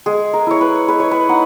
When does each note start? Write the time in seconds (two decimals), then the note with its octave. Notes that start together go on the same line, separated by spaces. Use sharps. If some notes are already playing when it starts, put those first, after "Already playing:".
0.06 G#3 G#4
0.33 A#4
0.47 E4 C#5
0.61 B4
0.88 G#3 B4
1.00 C#5
1.11 B4
1.29 D#4 F#5